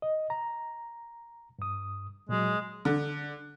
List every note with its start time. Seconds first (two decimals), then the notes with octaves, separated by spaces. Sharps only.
0.02 D#5
0.30 A#5
1.59 G2 D#6
2.29 A#2 F#3 G#3
2.85 D3